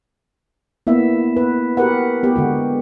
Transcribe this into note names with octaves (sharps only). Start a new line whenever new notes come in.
A#3 B3 E4 E5
B4
F#4 G4 A#4 B4 F#5
B3 G4
D3 G#3 F#4